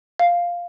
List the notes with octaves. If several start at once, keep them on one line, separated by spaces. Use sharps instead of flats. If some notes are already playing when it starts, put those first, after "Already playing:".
F5